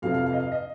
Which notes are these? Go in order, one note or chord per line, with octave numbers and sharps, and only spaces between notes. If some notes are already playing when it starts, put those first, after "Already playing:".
F2 C3 F3 F5
F5
F5
D#5
F5
D#5